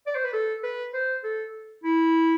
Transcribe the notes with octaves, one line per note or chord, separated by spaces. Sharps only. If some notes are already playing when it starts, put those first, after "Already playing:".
D5
C5
B4
A4
B4
C5
A4
E4